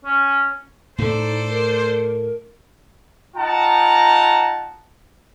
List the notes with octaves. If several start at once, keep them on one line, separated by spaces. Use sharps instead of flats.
C#4
A2 A3 D#4 A4 C5 D5
A#4
D#4 F4 F#5 G5 A5 A#5